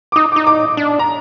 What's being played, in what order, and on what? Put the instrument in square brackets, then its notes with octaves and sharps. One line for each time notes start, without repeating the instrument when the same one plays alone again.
[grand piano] D6
[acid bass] D#4 [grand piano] D#6
[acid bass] D#4 [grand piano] D6
[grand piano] D6
[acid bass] D4
[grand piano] A#5